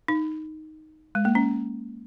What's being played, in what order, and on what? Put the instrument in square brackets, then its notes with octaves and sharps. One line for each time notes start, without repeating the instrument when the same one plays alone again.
[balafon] D#4
G#3
A#3
C#4